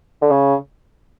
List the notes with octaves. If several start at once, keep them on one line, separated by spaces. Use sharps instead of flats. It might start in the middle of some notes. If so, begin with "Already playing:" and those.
D3
C#3